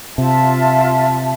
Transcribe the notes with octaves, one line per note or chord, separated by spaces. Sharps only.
C3 F4 E5 A5